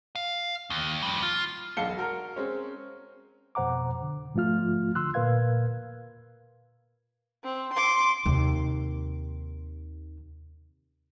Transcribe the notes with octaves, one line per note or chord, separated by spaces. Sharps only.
F5
D#2
F3 G3
F4
E1 B1 F5 A5 C#7 G7
F#4 A#4 F6
G#3 C4 C#4
F2 B2 C5 F#5 A#5 D6
D3
G#2 F3 A3 F4 F6
D3 C6 E6 F#6
A#2 A#4 B4 F5 G#6
C4
C6 D6
D#2 C3